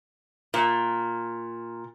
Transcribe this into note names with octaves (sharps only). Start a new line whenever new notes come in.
A#2